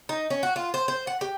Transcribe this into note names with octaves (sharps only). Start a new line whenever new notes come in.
D#4
C#4
F#4
F4
C5
C5
F#5
G4